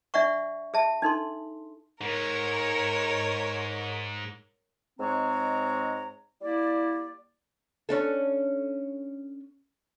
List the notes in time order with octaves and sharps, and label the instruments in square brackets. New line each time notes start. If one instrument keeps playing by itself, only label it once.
[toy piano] D4 D5 E5 F#5 C#6
G#4 E5 A5
D4 D#4 A4 C6
[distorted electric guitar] G#2 [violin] A#4 C#5
[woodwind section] G#2 G#3 C4 C#5 A#5
G3 A#3 E4 D5
[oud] C#4 D4 A4